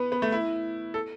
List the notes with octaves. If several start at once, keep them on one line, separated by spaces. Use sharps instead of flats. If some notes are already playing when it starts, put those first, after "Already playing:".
Already playing: B3 B4
B3
A3
E4
A4